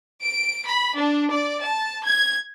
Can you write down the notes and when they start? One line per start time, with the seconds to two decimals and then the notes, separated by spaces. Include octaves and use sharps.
0.22 D7
0.66 B5
0.97 D4
1.32 D5
1.64 A5
2.04 G#6